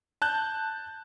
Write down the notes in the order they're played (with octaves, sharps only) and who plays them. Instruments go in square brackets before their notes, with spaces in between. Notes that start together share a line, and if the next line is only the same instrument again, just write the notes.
[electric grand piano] A5 F#6 G6